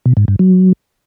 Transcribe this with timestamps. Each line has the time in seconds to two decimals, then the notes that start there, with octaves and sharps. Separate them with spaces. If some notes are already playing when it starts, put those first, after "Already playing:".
0.06 B2
0.17 G#2
0.28 G2
0.39 F#3